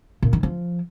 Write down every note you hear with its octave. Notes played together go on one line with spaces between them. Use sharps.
A#2
D#3
F3